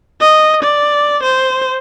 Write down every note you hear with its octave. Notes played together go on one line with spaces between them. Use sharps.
D#5
D5
C5